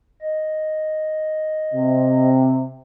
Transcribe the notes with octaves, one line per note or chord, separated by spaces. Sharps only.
D#5
C3